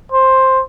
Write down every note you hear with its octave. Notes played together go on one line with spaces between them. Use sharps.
C5